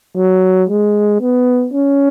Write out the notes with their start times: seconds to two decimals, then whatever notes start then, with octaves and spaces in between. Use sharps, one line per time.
0.17 F#3
0.70 G#3
1.22 B3
1.74 C#4